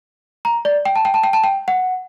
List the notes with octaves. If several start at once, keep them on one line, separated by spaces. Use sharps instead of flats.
A#5
D5
G5
A5
G5
A5
G5
A5
G5
F#5